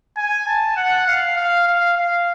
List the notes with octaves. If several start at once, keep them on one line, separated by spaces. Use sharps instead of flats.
G#5
A5
F#5
F5
F5
F5
F5